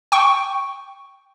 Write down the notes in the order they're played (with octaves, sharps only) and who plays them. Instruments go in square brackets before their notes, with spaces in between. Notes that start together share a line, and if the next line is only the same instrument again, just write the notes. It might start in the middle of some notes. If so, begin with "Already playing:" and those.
[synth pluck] G5 C#6